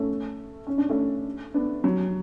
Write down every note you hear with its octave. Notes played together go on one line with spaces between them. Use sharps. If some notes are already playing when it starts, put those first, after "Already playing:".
Already playing: A3 C#4
C#4
D4
A3 C#4
B3 D4
F#3